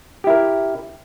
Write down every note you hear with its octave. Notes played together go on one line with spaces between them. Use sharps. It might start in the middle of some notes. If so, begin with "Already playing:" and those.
E4 G4 A#4